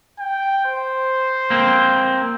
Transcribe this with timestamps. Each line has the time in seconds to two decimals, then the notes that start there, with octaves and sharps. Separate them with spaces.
0.19 G5
0.66 C5
1.50 A#3 C4